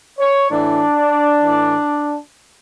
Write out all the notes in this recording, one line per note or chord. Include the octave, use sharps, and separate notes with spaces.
C#5
A2 E3 D4
A2 E3